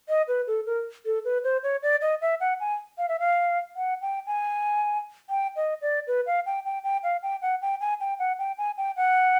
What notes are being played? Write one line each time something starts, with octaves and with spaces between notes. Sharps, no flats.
D#5
B4
A4
A#4
A4
B4
C5
C#5
D5
D#5
E5
F#5
G#5
F5
E5
F5
F#5
G5
G#5
G5
D#5
D5
B4
F5
G5
G5
G5
F5
G5
F#5
G5
G#5
G5
F#5
G5
G#5
G5
F#5